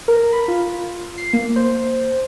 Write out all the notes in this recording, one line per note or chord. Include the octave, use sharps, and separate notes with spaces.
A#4
B5
F4
C7
A#3
C5